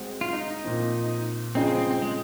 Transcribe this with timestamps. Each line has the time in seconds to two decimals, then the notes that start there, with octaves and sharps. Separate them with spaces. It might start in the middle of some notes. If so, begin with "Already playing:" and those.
Already playing: G#3 C4 F#4
0.21 F4
0.33 D#4
0.48 D#4
0.63 A#2 F3 C4
1.55 C#3 F3 G#3 C4 D#4 G#4
1.67 C4
1.78 C4
1.91 C4
2.02 G#3